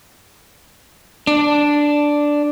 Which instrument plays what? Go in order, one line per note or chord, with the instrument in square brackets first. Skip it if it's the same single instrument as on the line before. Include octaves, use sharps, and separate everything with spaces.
[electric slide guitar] D4